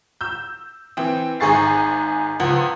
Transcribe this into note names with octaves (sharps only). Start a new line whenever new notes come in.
E6 G6
E3 C4
G#1 G#2 G#4 C#6 A6 C7
C#2 F3 F#5